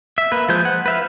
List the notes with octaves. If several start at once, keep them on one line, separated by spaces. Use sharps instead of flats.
E5
A#3 B4
F3 G#3 C5 G6
F#5
B4 E5 F5